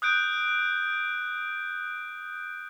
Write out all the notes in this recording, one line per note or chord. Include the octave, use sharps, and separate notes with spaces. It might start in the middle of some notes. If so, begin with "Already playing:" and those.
D#6 F#6 G6 D7